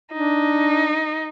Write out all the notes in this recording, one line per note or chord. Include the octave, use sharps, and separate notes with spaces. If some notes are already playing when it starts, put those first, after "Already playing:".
D4 D#4